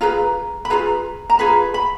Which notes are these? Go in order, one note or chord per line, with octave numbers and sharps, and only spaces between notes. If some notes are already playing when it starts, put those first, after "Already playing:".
F4 G#4 B4 A#5
B5
F4 G#4 B4 A#5
A#5
F4 G#4 B4 B5
B5